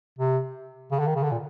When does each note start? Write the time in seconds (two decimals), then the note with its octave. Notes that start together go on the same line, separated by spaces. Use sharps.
0.19 C3
0.91 C#3
0.99 D3
1.07 D#3
1.16 C#3
1.23 D3
1.32 A#2